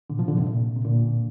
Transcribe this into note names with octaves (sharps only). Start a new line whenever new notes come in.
A#2 D3
C3 F3
A#2 D3
G2 C3
A#2
C3
A#2 D3